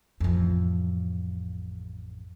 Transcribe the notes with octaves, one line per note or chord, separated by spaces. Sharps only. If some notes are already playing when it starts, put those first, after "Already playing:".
A1 F2